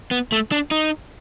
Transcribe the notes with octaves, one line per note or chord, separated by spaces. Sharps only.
B3
A3
D4
D#4